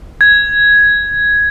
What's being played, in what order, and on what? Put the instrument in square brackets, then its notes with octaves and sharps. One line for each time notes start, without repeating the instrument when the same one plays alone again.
[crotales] G#6